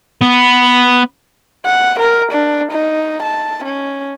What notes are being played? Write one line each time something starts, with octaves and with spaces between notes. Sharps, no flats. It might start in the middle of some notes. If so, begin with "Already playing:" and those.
B3
F#5
A#4
D4
D#4
A5
C#4